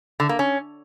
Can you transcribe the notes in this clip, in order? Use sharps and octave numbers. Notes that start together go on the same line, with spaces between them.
D3
A#3
C#4